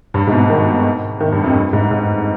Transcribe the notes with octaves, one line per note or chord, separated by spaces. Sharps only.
G2
G#2
B2
D#3
D#3
G2
F2
G2
G#2
G#2